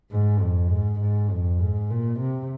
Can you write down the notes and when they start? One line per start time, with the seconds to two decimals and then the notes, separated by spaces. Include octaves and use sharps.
0.11 G#2
0.40 F2
0.70 G#2
1.00 G#2
1.30 F2
1.60 G#2
1.90 A#2
2.20 C3